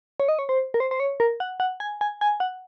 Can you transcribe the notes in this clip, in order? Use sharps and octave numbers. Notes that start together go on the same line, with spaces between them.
C#5
D#5
C#5
C5
A#4
C5
C5
C#5
A#4
F#5
F#5
G#5
G#5
G#5
F#5